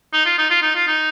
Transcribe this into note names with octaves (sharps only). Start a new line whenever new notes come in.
D#4
F4
D#4
F4
D#4
F4
D#4